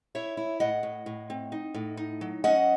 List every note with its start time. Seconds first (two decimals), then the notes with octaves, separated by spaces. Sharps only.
0.15 E4 C#5 E5
0.37 E4
0.60 A2 D#5 F#5
0.83 A2
1.06 A2
1.30 C4
1.52 D#4
1.74 A2
1.97 D#4
2.21 F#3
2.44 C#4 D#5 F#5